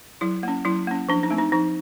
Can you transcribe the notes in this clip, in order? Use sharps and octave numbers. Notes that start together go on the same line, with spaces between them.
F#3 E4
A#3 C#4
F#3 E4
A#3 C#4
F3 D4
D#4
A3 C4
D#4
F3 D#4